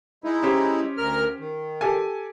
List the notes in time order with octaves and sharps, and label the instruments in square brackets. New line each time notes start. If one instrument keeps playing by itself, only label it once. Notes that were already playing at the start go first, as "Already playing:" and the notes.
[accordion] G#3 D#4 E4
[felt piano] C#4 G4 C5
[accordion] D2 A#4 F6
D#3
[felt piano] G4 A4 G#5